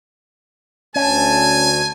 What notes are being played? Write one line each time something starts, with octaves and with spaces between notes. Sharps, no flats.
D2 C#4 G#5 A5